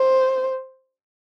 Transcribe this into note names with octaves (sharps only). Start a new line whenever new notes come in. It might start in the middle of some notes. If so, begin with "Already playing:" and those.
Already playing: C5